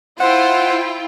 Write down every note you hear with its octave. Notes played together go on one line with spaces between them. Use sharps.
E4 F4 C5 F#5 G5